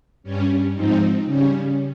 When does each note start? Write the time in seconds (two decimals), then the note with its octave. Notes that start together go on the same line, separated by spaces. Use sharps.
0.23 G2 G3 C#4
0.74 G#2 F3 C4 D#4
1.25 C#3 G3 C#4